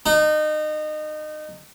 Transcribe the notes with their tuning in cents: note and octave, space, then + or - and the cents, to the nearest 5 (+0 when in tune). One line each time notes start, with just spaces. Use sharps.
D#4 -25